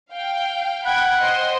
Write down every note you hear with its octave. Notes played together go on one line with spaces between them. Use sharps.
F5 G5
F#5 G5 B5 G#6
C5 D#5 C6